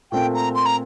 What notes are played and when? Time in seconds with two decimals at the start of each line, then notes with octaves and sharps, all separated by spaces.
0.12 A#2 A3 C4 G5
0.34 A#5
0.55 C6
0.66 A#5